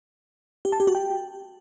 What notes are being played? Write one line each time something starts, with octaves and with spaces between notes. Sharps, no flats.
G4
A5
G4
F#4
G5